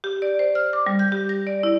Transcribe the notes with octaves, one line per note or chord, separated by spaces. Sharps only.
G4
D5
C5
F6
D6
G3
G6
G4
A#6
D5
E4